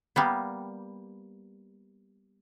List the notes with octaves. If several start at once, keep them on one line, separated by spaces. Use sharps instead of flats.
G3 A#3 B3